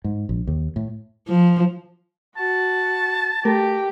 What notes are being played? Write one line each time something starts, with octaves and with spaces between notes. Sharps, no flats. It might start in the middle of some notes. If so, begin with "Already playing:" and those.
G#2
A#1
D#2
A2
F3
F#4 A5
A3 G4 A#4